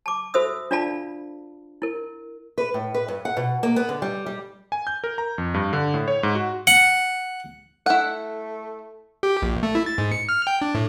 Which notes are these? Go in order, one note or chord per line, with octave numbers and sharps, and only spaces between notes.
A5 D6
F#4 A4 C5 E5 D#6 E6
D4 F4 D5 F5 A5 B5
E4 A#4
B4
A2
B4
G2
F#5
B2
A#3
B3
D3
G3
G3
G#5
G6
A#4
A#5
F2
G2
D3
A2
C#5
G#2
F#4
F#5
A3 E4 F#5
G4
A#1
A3
E4
A6
G#2
C#7
F6
G5
D4
A2